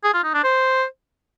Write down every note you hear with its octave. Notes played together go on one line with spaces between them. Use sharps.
G#4
F4
D#4
D4
C5